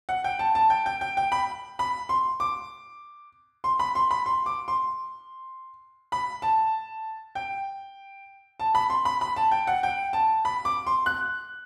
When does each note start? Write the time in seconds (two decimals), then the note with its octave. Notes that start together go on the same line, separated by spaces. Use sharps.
0.09 F#5
0.24 G5
0.39 A5
0.55 A5
0.70 G5
0.86 G5
1.01 G5
1.17 G5
1.32 B5
1.79 B5
2.09 C6
2.40 D6
3.64 C6
3.79 B5
3.95 C6
4.11 B5
4.26 C6
4.46 D6
4.68 C6
6.12 B5
6.42 A5
7.35 G5
8.60 A5
8.75 B5
8.90 C6
9.05 B5
9.21 B5
9.36 A5
9.51 G5
9.67 F#5
9.83 G5
10.13 A5
10.45 B5
10.65 D6
10.87 C6
11.06 F#6